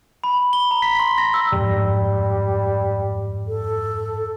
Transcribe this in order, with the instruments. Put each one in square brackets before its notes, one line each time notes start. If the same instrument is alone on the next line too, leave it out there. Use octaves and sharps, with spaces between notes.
[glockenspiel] B5
G7
A#5
B6
C6
A#6
E6
[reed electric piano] F2 G#2 [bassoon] G3
[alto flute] A4